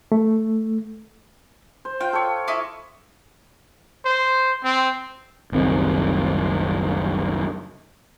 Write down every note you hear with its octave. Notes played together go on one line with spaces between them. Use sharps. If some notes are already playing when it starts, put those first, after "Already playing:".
A3
C5
F4 G5
A4 C#5
E4 D#5 D6
C5
C4
F#1 C2 D#3 C4